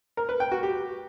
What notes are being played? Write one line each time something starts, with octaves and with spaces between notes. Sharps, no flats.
A#4
B4
G5
F#4
G4